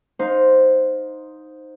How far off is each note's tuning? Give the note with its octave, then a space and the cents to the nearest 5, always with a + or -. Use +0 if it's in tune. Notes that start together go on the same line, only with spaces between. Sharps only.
D#4 +0 C5 +0 F5 +35